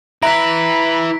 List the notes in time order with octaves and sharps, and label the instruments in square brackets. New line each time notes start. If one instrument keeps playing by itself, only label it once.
[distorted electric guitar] E4 B4 [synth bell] E5 A#5 A#6 [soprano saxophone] B5 [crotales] B6 D7